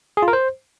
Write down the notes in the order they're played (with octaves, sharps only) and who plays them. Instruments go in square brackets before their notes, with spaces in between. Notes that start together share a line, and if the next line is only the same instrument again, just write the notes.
[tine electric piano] G#4
F4
A#4
C5